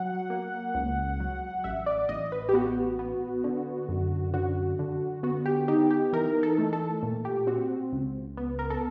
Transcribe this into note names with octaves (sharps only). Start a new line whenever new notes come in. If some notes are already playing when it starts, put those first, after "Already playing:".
Already playing: F#3 F#5
A#3
C#2
F#3
A1 E5
D5
A1 D#5
B4
G4
B3 F#4
B3
D3
F#2
D3 F#4
D3
B3 F#4
G4
D#4 G4
G4
E3 A#4
A4
A3
A4
A#2
G4
C4 F#4
C#2
B3
A#4
A4